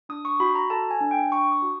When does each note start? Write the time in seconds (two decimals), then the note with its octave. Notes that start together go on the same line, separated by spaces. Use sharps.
0.09 D4 D#6
0.25 C#6
0.40 F#4 B5
0.55 A#5
0.70 A4 A5
0.91 G#5
1.01 D4
1.11 G5
1.31 D4 C#6
1.51 D#6
1.62 F#4